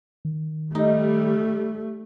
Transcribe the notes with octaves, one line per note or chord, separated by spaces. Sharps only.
D#3
G3 A3 D#4